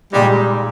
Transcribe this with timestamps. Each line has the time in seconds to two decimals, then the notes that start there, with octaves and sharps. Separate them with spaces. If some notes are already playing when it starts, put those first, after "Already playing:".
0.13 A#2 G3 G#3 D#4